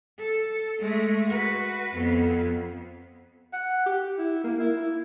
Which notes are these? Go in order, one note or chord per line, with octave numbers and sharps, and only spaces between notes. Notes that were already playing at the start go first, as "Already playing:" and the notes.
A4
G#3 A3
F#4 B4
F2 B3
F#5
G4
E4
A#3
E4
E4